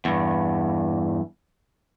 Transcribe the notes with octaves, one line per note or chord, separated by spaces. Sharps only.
E2 G2